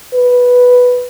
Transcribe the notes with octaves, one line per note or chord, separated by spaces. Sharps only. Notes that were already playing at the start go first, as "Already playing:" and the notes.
B4